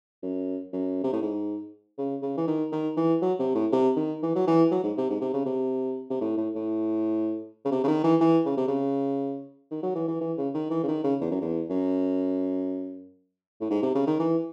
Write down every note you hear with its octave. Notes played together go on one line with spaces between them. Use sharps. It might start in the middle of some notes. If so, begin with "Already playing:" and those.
F#2
F#2
C3
A2
G#2
C#3
C#3
E3
D#3
D#3
E3
F#3
C3
A2
C3
D#3
E3
F#3
E3
F#3
G#2
C3
G#2
C3
C#3
C3
C3
A2
A2
A2
C#3
C3
C#3
D#3
E3
E3
C#3
C3
C#3
D#3
F#3
E3
E3
E3
C#3
D#3
E3
C#3
D#3
C#3
E2
F#2
E2
F#2
A2
G#2
C3
C#3
D#3
E3